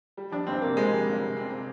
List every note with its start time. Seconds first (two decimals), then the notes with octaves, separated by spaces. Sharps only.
0.17 G3
0.32 F2 D4
0.47 G1 C4
0.62 C3 A#3
0.77 G3 G#3
0.91 F2
1.06 G1
1.22 C3
1.37 C4
1.51 C3